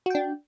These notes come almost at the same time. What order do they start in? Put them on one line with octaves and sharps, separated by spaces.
F#4 G5 D4